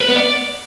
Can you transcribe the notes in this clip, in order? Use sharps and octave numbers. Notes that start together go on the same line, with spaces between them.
B4
B3
D5